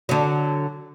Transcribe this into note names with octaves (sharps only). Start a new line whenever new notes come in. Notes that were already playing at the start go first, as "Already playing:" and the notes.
D3 F#3